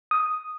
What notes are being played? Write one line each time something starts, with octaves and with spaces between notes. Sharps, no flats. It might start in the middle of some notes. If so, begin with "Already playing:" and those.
D#6